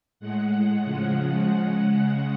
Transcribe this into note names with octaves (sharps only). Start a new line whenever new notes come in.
A2 G#3 F#5
C#3 F3 G#3 F#5
C#3 G#3 F#5
F#5